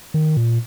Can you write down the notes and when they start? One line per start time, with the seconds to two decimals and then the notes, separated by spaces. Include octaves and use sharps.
0.14 D#3
0.37 A#2